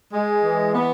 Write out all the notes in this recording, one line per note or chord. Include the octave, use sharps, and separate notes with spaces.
G#3
E3
B3